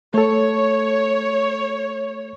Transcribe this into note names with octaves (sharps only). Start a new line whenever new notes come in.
A3 A4 C#5